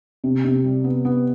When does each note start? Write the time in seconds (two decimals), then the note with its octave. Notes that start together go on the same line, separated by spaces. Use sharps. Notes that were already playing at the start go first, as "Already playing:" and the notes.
0.24 C3
0.44 C3
0.64 G3
0.84 B3
1.05 B3